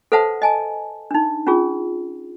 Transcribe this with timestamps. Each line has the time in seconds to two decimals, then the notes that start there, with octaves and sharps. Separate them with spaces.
0.12 A4 B4 C5 E5 F#5 A5
0.42 D#5 G#5 A5
1.11 D4 D#4
1.47 C#4 D4 F4 G#4